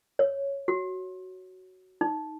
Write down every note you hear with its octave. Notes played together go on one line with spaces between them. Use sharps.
C#5
F#4
D#4